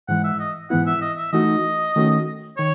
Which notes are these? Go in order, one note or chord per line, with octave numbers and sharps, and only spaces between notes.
G#2 E3 G#3 F#5
E5
D#5
G#2 E3 B3 E4 F#5
E5
D#5
E5
E3 A3 D#4 F#4 D#5
D#3 A3 C#4 F#4
D#3 C#5